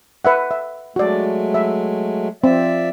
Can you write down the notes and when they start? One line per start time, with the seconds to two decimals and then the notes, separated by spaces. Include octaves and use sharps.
0.25 B4 E5 F#5
0.51 E5
0.96 F#3 G#3 A3 F#4 D5
1.54 E5
2.44 F3 C4 D5 E5